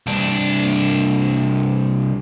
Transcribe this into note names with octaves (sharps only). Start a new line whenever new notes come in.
C2 D4